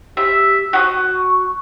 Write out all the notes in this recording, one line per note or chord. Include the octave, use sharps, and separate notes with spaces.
G4 E5
F#4 C#6 D#6